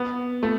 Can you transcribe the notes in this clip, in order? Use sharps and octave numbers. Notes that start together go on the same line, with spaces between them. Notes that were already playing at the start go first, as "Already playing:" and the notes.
Already playing: B3
A3